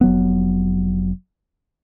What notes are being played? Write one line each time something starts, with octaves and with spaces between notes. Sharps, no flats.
F1 F#3 B3